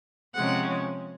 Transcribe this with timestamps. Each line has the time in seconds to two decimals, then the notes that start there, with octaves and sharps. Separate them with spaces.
0.34 C3 F3 G#3 C#4 F#5